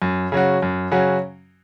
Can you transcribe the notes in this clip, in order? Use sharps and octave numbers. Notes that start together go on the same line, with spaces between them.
F#2
C#3 F#3 C#4 F#4
F#2
C#3 F#3 C#4 F#4